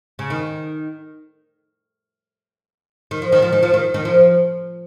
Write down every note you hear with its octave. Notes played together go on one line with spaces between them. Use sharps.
C#3
D#3
D#3
F3
D#3
F3
D#3
F3
D#3
D#3
F3